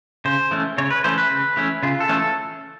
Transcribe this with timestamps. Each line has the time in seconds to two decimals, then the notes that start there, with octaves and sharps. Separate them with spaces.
0.25 C#3 C5
0.51 E3 A3 C#4
0.78 C#3 C#5
0.91 B4
1.04 E3 A3 C#4 C5
1.18 B4
1.30 C#3
1.57 E3 A3 C#4
1.83 C#3 F4
2.00 A4
2.09 E3 A3 C#4
2.18 A4